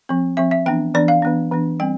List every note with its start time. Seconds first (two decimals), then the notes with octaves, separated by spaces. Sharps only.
0.09 F3 C4
0.37 F3 C4 E5
0.51 E5
0.66 E3 B3 D4 G5
0.94 E3 B3 D4 D5
1.08 F5
1.22 E3 B3 D4
1.52 E3 B3 D4
1.80 G3 C4 G5